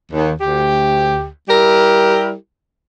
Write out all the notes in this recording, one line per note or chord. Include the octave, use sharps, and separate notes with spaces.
D#2
D2 G4
G3 E4 G4 A#4